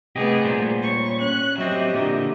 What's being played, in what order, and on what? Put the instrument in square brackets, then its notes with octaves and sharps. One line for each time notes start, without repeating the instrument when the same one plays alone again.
[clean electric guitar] C3 G4 D#5 [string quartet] A3 B3 G#4
[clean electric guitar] A#2 G3 C5
[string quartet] C#5 C#6
C#4 F#6
[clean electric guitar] F#3 C4 [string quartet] G4 D#5 E5
[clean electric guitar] A#2 D3